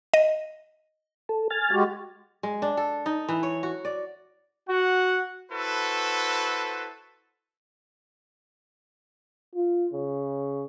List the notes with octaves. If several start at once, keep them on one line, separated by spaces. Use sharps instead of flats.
D#5
A4
G#5 F6 A6
G#3 F#4 G4
G#3
D4
A4
D#4
E3
C#5
F#4
D5
F#4 F#5
E4 F#4 A4 B4 C5
F4
C#3